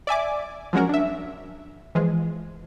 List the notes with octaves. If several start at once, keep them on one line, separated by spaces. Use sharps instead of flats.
D5 E5 G#5 D6
F3 F#3 G#3 C#4 F#4 A#4
D4 E5
E3 F3 G#3